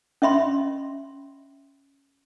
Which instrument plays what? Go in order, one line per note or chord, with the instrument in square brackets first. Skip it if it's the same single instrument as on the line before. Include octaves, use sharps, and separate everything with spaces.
[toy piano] C#4 D#5 E5 B5 C6